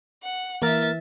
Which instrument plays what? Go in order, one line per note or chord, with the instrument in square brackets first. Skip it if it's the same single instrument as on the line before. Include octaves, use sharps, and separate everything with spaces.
[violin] F#5
[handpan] E3 [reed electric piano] A#3 A#4 F6 [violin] E5 A6